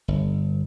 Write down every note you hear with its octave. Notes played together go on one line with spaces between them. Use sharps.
G1